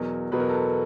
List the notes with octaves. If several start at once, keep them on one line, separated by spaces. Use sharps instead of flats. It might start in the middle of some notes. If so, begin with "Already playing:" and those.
Already playing: E2 B2 F#3 A#4
E2 B2 F#3 B4
A#4
A4
A#4